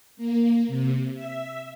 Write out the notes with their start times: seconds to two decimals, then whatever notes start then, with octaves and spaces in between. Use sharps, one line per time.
0.17 A#3
0.68 C3
1.14 E5